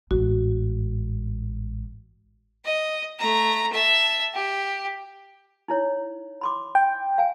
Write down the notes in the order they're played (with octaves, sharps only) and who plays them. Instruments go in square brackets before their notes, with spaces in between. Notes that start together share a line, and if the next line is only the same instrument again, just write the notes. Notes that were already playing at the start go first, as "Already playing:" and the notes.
[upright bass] A1 G#2 [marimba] F#4
[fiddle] D#5
A3 A#5
E5 A5
G4
[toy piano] D#4 E4 C#5
B5 C6 D6
[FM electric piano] G5
[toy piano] F5 G#5